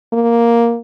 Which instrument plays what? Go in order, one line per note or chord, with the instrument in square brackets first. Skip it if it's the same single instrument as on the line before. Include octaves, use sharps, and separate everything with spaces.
[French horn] A#3